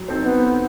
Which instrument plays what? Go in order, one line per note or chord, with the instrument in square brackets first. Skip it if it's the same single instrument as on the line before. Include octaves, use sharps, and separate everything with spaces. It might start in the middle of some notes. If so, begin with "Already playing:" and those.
Already playing: [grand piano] F#3
C4 D#4 A4 C5
[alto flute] B3